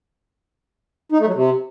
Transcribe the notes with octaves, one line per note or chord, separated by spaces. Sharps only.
D#4
A3
F#3
C3